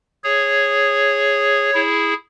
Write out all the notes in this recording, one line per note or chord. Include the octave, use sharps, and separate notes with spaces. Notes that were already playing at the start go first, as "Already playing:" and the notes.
G#4 C#5
E4 G#4